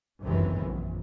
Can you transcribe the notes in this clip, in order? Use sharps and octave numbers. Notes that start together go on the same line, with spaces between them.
G1 C#2 F#2 C3 D#3 E3
A#1